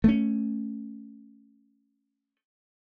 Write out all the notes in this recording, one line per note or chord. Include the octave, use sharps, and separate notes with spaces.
A3 C#4